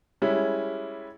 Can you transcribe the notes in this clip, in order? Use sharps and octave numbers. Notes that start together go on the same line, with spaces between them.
G3 G#3 C#4 E4